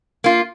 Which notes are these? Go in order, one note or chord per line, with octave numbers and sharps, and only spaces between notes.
A#3 F4